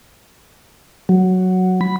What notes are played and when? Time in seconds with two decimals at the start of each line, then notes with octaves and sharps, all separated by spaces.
1.09 F#3
1.81 B5